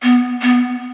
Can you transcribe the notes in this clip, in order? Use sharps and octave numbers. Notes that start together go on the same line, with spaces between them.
B3
B3